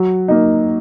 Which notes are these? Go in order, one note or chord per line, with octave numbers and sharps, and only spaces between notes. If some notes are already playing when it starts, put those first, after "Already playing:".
Already playing: F#3
A#3 D#4